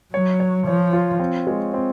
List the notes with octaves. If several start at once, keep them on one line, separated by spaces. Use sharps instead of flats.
F#3 C#5
C#5
F3 C#5
F4
C4
G#3
C4